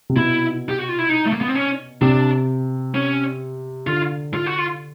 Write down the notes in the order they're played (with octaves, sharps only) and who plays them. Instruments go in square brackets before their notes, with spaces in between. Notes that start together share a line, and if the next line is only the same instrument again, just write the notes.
[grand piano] C3
[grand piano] B2 [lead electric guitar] E4
[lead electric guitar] G4
F#4
F4
E4
D#4
A3
A#3
B3
C4
C#4
[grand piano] C3 [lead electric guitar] D4
[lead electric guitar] C#4
[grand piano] D3 [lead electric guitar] F4
[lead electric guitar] F4
F#4
F4